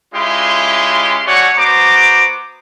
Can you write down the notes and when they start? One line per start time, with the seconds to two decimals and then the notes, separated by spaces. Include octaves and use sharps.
0.14 G#3 C#4 E4 F4 G4 C6
1.26 A3 F#4 C#5 D5 F#5 G#5
1.57 B3 F#4 C5 A#5 D6